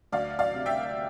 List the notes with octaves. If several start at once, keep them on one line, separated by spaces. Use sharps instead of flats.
D2 D5 F5
D5 F5
C3
E5 G5